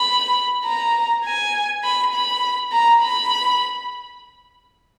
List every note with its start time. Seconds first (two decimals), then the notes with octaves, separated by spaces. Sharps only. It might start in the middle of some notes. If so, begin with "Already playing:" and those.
Already playing: B5
0.66 A#5
1.25 G#5
1.83 B5
2.14 B5
2.72 A#5
3.02 B5